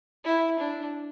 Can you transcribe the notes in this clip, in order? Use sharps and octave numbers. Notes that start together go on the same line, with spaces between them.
E4
D4